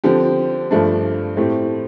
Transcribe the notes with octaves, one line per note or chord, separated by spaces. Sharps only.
D3 F3 C4 G4
G2 F3 A3 D4
A2 A3 C4 G4